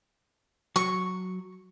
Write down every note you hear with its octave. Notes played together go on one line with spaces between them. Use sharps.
F#3 C#6